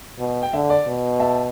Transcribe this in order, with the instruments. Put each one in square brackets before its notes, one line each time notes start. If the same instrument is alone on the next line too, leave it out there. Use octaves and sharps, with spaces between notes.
[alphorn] B2
[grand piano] G5
[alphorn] D3 [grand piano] E5
[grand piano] D5
[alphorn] B2
[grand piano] E5 A5